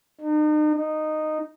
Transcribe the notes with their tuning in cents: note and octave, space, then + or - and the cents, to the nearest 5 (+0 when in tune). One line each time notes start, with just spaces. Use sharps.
D#4 -40
D#4 -10